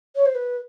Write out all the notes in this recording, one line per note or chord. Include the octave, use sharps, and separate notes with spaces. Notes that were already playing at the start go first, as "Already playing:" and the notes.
C#5
C5
B4